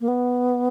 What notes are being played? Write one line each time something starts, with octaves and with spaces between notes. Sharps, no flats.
A#3
B3